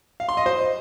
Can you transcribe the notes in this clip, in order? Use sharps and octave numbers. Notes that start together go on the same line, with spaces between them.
F5
C6
D#5
C5